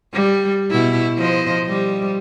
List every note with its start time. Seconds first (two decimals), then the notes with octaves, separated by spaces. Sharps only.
0.13 G3
0.71 B2 E4
1.17 F3 C5 D#5
1.69 G3